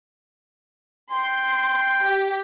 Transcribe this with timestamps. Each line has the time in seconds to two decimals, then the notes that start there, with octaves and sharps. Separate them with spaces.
1.12 G5 C6
2.04 G4